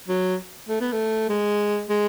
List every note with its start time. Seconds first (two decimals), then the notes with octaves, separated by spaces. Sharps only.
0.08 F#3
0.69 A3
0.80 B3
0.92 A3
1.29 G#3
1.90 G#3